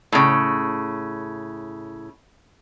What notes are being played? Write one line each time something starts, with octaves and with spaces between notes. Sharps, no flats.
A2 C#3